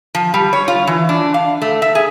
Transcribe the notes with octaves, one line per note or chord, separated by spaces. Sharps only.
F3
G3
C#5
F4
E3
D4
F5
A3
E5
G#4